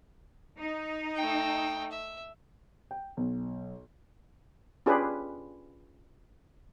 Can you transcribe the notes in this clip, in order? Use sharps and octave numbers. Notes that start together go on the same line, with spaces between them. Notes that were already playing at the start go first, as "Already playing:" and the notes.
D#4
A3 G5
E5
G5
B1
C#4 D4 F4 G4 G#4 B4